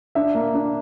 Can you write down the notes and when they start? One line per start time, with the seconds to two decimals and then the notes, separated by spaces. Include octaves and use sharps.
0.15 D4 E5
0.35 A#3
0.54 D4